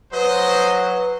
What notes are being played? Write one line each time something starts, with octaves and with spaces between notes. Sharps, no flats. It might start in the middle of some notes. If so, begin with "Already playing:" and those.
F#3 B4 C5 D#5